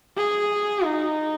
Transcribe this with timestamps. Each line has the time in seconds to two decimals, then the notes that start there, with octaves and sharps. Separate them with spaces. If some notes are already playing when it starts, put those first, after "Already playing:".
0.17 G#4
0.84 D#4